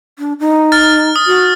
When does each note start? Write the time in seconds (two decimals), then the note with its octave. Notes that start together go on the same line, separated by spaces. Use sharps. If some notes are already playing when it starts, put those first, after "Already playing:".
0.19 D4
0.40 D#4
0.72 F6 A6
1.16 D#6
1.27 F#4